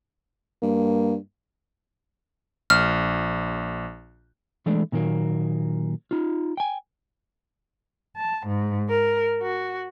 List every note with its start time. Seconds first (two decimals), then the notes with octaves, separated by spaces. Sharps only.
0.63 G2 A#3
2.70 A#1 F6
4.66 E3 G#3 A3 D4
4.92 A#2 D#3 F#3 A#3
6.11 D#4 F4
6.57 G5 G#5
8.16 A5
8.47 G#2
8.89 A#4
9.42 F#4